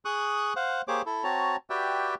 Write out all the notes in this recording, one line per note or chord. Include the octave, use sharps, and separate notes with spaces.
G#4 C#6 D#6 F#6
C5 F5 F#5
A#3 G4 G#4 C5 C#5 D6
E4 A4
C4 F#4 C#5 A5 A#5
F#4 G4 B4 D5 E5 G5